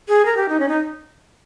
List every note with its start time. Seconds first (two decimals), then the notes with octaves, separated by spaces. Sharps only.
0.08 G#4
0.25 A#4
0.37 G4
0.49 D#4
0.60 C#4
0.69 D#4